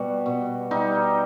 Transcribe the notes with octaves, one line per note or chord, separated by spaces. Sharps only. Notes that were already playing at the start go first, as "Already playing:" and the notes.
Already playing: B2 G3 F#4
B2
G3 D#4